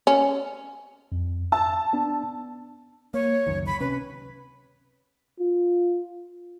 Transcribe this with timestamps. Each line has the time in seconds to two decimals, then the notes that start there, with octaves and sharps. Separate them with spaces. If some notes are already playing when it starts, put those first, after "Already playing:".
0.07 C#4
1.12 F2
1.52 A5 E6
1.93 B3 D4
3.14 A#3 C#5
3.47 C#2 F#2 D#3
3.66 B5
3.80 C3 C#4 B4
5.39 F4